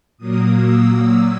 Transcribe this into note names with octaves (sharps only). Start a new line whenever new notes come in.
A#2 F#3 A#3 D#6
E6
D#6